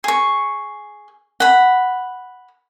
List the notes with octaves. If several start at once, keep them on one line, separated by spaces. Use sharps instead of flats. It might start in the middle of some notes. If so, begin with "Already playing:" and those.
G#4 C#6
F#5 B5